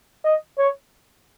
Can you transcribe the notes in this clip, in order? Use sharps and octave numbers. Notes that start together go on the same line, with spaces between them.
D#5
C#5